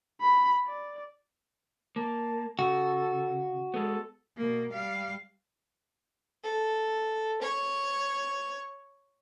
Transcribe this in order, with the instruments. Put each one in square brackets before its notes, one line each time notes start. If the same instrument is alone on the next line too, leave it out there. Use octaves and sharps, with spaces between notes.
[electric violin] B5
D5
[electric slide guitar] A#3 [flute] A5
[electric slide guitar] C#3 [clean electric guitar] F#4 [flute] A4
[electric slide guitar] G#3 B3 [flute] A4
[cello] B2 A#3
G3 F5
[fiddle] A4
C#5